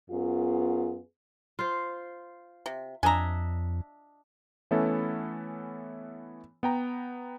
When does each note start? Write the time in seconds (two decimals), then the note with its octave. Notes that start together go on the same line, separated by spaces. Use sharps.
0.11 F#2 B3 F4 G#4
1.59 F4 C5
2.66 C3
3.03 F2 D4 D#5 E5 G#5 A#5
4.71 E3 A3 B3 C#4 E4 A4
6.63 B3 G5 A#5